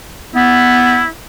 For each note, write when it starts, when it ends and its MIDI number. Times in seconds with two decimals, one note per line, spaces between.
0.35 1.02 59
0.35 1.07 64